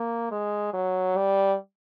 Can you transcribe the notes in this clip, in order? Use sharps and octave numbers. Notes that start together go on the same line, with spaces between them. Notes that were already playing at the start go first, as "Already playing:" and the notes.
Already playing: A#3
G#3
F#3
G3